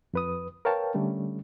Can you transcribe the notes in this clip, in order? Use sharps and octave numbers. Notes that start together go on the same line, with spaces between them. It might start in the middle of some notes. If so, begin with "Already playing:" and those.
F2 B4 D#6
A#4 B4 C#5 F5 G5 A5
D3 G3 A3 C#4